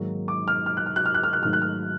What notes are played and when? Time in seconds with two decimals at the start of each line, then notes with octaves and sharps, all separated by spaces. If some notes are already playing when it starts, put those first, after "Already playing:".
Already playing: G#2 D#3 F#3 A#3
0.28 D6
0.48 F6
0.66 F6
0.77 F#6
0.86 F6
0.96 F#6
1.06 F6
1.14 F#6
1.24 F6
1.33 F#6
1.43 G#2 D#3 F#3 A3 F6
1.53 F#6
1.62 F6